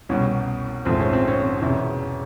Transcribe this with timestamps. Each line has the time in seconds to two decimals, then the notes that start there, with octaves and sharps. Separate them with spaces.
0.09 C2 B2 G3 C#4
0.85 A#1 G#2 F3 A3 C4
0.99 C#4
1.13 C4
1.28 C#4
1.42 C4
1.62 E1 E2 C3 C#4